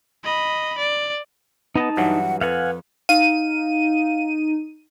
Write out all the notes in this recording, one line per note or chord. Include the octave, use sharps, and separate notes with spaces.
D#5 B5
D5
B3 D#4 D#5 A5
G2 E3 F#3 F#5
F2 B4 F5 F#5 G#5
D#4 F5 D#7